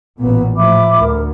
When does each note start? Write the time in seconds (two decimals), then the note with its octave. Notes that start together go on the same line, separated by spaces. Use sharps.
0.19 A1 A#2 B3
0.56 A2 F3 E5 B5 D6
1.00 D2 A#4